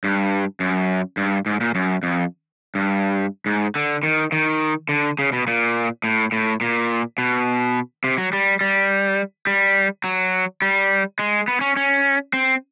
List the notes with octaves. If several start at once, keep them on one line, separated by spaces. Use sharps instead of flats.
G2
F#2
G2
G#2
A#2
F#2
F2
G2
G#2
D3
D#3
D#3
D3
C#3
B2
A#2
A2
A2
A#2
B2
C3
F#3
G3
G3
G3
F#3
G3
G#3
B3
C#4
C#4
C4